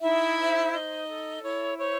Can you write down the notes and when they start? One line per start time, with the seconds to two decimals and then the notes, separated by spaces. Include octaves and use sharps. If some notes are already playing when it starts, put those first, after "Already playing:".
0.01 D#4 E4 E5
0.37 C5
0.72 D#4 D#5
1.07 A4
1.42 E4 C#5
1.77 C5 C#5